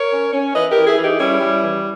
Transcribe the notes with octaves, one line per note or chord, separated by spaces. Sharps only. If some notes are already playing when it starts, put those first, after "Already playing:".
Already playing: A#4 C#5
C#4
C#4
E3 B4 D#5
G4 A#4
E3
E4 G#4
E3
D#4 G4
G3 C#4 E4
G3
E3